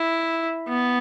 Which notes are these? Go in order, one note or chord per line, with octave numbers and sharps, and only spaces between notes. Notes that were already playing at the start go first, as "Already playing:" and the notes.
Already playing: E4
B3